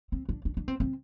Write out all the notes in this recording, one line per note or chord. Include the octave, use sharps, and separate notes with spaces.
C4
D4
D4
D4
C4
C4